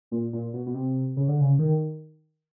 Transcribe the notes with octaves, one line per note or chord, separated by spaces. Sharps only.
A#2
A#2
B2
B2
C3
C#3
D3
C#3
D#3